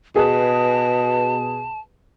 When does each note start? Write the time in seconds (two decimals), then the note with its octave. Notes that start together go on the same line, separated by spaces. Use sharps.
0.16 B2 G#4 B4 A5